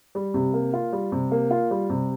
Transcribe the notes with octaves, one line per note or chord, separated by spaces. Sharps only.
G3
C3
A#3
F4
G3
C3
A#3
F4
G3
C3